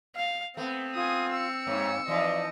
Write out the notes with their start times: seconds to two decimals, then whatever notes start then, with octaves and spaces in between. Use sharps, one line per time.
0.16 F5
0.57 A3 B3 C4
0.95 F4 G#5 D#6
1.32 E6 C#7
1.67 G2 A#3 C#5
2.08 E3 F3 D#4 D5 D#5